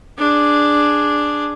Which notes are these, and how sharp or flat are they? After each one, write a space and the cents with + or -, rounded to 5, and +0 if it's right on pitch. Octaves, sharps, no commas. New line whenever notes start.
D4 +0 G#4 +0